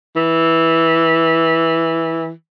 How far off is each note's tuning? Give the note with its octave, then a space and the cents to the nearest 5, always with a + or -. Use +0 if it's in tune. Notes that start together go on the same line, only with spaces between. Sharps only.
E3 -10